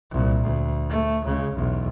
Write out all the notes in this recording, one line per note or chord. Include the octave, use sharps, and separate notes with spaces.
C2 A#2
D2
A3
C#2 C#3
B1 E2